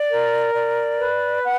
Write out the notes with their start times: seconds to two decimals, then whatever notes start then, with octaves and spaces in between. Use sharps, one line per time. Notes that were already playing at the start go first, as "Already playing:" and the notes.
Already playing: D5
0.10 A#4
0.54 D5
0.98 B4
1.43 F#5